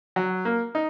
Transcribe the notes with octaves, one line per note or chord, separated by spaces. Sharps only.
F#3
A#3
D#4